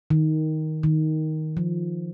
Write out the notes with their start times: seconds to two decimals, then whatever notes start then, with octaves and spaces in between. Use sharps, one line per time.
0.10 D#3
0.83 D#3
1.57 F3